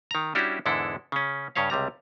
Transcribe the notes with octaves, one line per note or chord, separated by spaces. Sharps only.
D#3 A#5
G3 C#4 D4 E4 F#4 G4
E2 G#2 D3 G#3 E4 A4
C#3 C#4
G2 C#3 C#4 C#5 F5
C#2 C3 G3 A#5